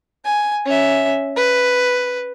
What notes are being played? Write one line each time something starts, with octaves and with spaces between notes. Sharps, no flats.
G#5
C#4 E5
B4